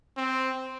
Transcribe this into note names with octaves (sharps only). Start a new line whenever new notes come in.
C4